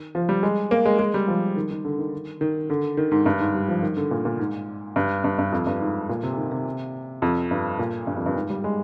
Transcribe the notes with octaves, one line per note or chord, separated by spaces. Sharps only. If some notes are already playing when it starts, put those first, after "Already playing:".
Already playing: D#3
F3
G3
G#3
A#3
G#3
G#3
G3
F3
D#3
D#3
D3
D#3
D#3
D3
D#3
G#2
G2
G#2
G3
F3
D#3
D3
A#2
A#2
G#2
G2
G2
G2
F2
G2
G#2
A#2
C3
D#3
C3
F2
G2
A#2
G2
F2
G2
G#2
G3
G#3